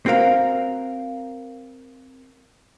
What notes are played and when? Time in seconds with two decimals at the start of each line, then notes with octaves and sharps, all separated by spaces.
0.06 C4 F#4 A#4 F5